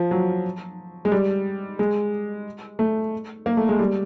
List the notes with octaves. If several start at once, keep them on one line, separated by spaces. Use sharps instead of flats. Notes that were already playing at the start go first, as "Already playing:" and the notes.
Already playing: F3
F#3
G#3
G3
G#3
A3
A#3
A3
G#3
G3